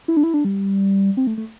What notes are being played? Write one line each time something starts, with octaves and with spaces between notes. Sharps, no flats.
E4
D4
E4
D4
G3
C4
A3
A3